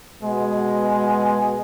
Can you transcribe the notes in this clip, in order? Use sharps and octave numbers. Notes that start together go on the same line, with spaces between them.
B2 G#3